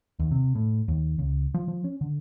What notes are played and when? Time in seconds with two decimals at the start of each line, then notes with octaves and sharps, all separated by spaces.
0.19 D#2
0.31 C3
0.55 A2
0.88 D#2
1.19 C#2
1.54 F3
1.68 F3
1.84 C#4
2.01 D3